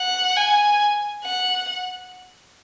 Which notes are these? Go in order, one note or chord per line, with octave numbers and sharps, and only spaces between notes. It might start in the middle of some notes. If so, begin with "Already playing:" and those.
Already playing: F#5
G#5
F#5